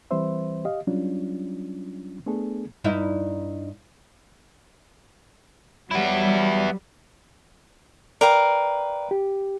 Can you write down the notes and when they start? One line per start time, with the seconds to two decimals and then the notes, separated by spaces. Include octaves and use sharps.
0.11 E3 G3 C4 B4 C5 E5
0.65 G4 D#5 F5
0.87 F#3 G3 C#4 D4 F4
2.26 A3 B3 D4 G#4 A4
2.84 G2 D#4 E4
5.91 F#3 G3 B3 E4
8.21 A#4 B4 D5 F5 G5
9.11 G4